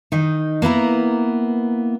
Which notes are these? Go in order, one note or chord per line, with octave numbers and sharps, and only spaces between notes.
D#3 D#4
A#3 B3 E4 A#5